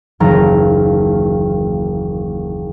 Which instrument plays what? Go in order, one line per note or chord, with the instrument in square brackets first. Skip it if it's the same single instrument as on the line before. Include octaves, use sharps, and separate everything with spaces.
[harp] F#1 D#2 E3 A5 A#5 F6